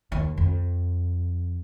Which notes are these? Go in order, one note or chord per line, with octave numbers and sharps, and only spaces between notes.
D#2
F2